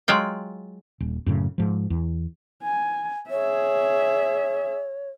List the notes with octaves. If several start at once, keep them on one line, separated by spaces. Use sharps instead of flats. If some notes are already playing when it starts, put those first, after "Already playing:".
F#3 G#3 F4 G5
D#1
F#2 A2 C#3
G#2 F3
E2
G#5
G#4 C#5 E5